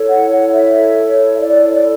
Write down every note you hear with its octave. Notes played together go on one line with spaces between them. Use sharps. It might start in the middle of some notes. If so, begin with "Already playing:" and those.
Already playing: E4 A4 C#5
F#5
F#5
E5
E5
D5
D5